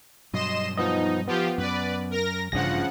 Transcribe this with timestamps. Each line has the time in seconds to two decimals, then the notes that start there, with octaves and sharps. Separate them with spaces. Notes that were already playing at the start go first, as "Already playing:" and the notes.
0.33 G2 B2 F#3 D#5 C6 E7
0.77 F3 B3 D#4 D#5
1.28 F3 B3 F4 G4
1.58 F#2 B4 D5
2.11 A#4 A#6
2.52 A1 G2 C#3 F3 D4 F#5 A#6